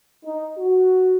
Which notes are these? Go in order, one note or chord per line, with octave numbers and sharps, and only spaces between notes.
D#4
F#4